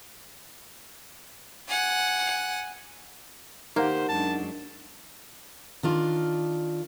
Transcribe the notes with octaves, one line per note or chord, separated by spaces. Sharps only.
F#5 G#5
D#3 A#3 D#4 G4 C5 F#5
F#2 G#3 D4 A5
D#3 D4 F4